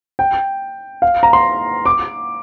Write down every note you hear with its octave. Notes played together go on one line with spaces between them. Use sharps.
G5
F5
A#5
C6
D6